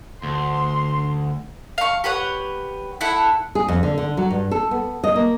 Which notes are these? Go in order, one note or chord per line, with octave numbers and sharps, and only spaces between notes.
D2 C6
F5 C#6
G4 B4 C#5 F#5
E4 A4 F#5
G#4
F2
D3
D3
F#3
G2
A4
B3
D#5
A#3